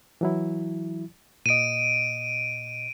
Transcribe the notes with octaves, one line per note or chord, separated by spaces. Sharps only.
E3 F#3 E4
A#2 D#5 D7 D#7